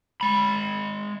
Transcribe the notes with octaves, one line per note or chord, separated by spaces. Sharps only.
G#3 B5